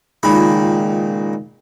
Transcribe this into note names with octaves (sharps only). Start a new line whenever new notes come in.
C#2 A#2 D#3 B5